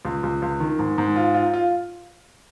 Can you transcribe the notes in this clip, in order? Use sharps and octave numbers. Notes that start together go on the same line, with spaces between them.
C#2
C#2
C#2
D#3
G#2
G#2
F4
F4
F4